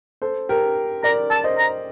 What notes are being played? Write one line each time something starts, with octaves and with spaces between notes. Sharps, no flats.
A4 C5
G4 A#4
A#4 D5 A#5
A5
C5 D#5
A#5